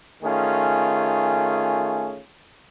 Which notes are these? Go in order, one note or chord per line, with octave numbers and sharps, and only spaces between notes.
D#3 A3 C#4 F4 G#4